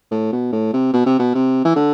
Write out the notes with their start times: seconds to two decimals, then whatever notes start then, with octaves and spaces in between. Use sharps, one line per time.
0.11 A2
0.32 B2
0.52 A2
0.73 C3
0.93 B2
1.06 C3
1.19 B2
1.35 C3
1.65 E3
1.76 D3